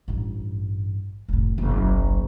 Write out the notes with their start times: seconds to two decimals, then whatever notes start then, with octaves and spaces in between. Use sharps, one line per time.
0.08 A1 G2
1.28 F1 A2
1.58 F#1 B1